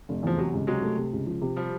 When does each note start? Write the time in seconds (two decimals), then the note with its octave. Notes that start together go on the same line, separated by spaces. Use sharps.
0.09 F1
0.23 E2 F3
0.37 C3 F#3
0.53 C#2
0.67 C3 F#3 G#3
0.82 A3
0.97 C3
1.13 C#2
1.26 F3
1.42 C3
1.56 F3 G3